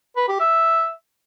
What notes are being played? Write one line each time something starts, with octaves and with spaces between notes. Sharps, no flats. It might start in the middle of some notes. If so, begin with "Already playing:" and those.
B4
G4
E5